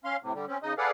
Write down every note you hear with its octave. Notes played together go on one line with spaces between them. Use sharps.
C#4 F5 C6
A2 C3
D3 G3
C4 C#4
C#3 D#4 D#5
G#4 A4 B4 D5 F5 F#5